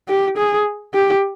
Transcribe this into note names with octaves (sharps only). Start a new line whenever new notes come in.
G4
G#4
G4